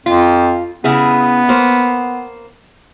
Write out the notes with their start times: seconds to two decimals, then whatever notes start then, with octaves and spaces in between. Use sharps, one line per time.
0.06 F2 F4
0.84 C#3 B3 E4 G#4
1.49 A#3 C5